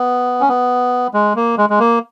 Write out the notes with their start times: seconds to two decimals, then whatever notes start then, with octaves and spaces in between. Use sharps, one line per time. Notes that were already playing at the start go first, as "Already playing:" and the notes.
Already playing: B3
0.41 C#4
0.49 B3
1.14 G#3
1.36 A#3
1.58 G#3
1.70 G#3
1.79 A#3